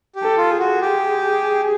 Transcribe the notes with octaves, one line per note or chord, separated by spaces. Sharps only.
G4
A4
F4
G#4
F#4
G4